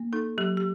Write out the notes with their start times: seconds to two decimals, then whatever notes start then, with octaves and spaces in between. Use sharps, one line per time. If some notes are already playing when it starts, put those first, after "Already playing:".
Already playing: A#3
0.13 D#4 A4
0.38 F#3 G4
0.57 G4